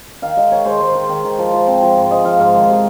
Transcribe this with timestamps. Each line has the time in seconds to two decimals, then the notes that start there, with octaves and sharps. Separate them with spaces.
0.22 D#3 F5
0.37 G#3 D#5
0.51 D#3 C#5
0.66 G#3 C5
0.81 G#3 C5
0.95 D#3
1.09 D#3
1.24 D#3
1.39 F3
1.53 F3
1.67 C4
1.83 F3
1.97 G#2
2.11 F3 D#5
2.25 F3 F5
2.40 G#2 F5
2.54 D#3
2.69 C3